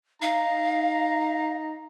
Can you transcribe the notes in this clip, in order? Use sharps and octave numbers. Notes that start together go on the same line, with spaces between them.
D#4 F5 A#5